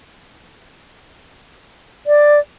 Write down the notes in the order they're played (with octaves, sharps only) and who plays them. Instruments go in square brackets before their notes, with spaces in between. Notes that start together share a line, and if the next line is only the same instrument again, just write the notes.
[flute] D5